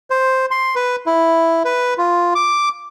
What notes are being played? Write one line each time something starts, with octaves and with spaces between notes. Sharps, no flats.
C5
C6
B4
E4
B4
F4
D6